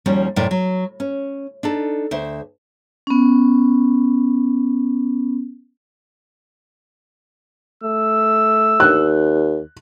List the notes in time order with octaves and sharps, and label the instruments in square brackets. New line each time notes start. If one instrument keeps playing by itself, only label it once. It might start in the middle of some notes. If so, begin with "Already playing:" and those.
[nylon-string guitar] D#2 F3 G3 C#4 F#4
F#2 A2 C3 A#4 D5
F#3
C#4
D4 D#4 A4
D2 C5 E5
[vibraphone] B3 C#4
[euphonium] A3 [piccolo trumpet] E6
[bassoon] D#2 [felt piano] F#6